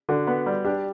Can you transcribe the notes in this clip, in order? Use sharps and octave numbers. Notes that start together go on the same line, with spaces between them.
D3 F#4
B3
G3
D4 G4